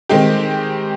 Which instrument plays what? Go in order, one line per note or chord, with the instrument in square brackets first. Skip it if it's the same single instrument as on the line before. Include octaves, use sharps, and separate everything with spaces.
[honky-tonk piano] D#3 G#3 C4 D#4 G4